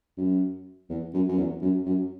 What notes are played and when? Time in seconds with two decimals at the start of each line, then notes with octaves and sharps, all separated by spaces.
0.17 F#2
0.89 E2
1.14 F#2
1.28 F#2
1.38 E2
1.62 F#2
1.86 F#2